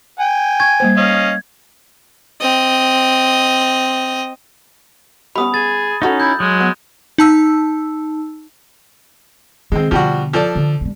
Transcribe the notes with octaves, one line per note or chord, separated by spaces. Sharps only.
G5 G#5
C#6 G#6
G3 A#3 C5
C#4 D#5 F5
C4 D#5
G3 B3 C#4 B5 D#6
G#4 A6
E3 C#4 D#4 F#4 A4
E4 G6
F#3 G#3
B3
D#4 A5 E6
D#3 G#3 C4
B2 D3 F3 G3 F#4
F3 A4 D5
D3
E3 G3